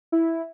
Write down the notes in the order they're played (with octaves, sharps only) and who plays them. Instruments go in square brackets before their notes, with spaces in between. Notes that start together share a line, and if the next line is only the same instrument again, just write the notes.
[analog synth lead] E4